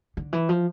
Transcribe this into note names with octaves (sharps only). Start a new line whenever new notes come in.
D3
E3
F3